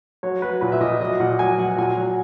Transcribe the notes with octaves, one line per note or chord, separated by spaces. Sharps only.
F#3 C#5
F#3 B4
A#2 B4
E5
A#2 D#5
F#3 D#5
A#2 F#5
F#3 G#5
F#3 F#5
A#2 G#5
F#3